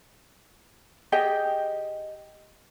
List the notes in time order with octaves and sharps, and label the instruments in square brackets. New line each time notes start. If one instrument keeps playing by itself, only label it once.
[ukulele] G4 G#4 D#5 G5